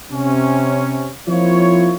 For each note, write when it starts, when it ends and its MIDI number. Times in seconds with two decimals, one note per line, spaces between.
0.12 1.11 48
0.12 1.11 61
1.28 1.96 53
1.28 1.96 58
1.28 1.96 60
1.28 1.96 64
1.28 1.96 65
1.28 1.96 73